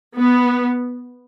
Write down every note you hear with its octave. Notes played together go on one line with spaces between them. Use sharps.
B3